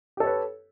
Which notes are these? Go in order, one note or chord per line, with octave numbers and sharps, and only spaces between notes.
G4 A4 B4 C#5